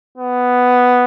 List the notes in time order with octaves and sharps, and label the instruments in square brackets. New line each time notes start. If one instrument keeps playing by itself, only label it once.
[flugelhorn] B3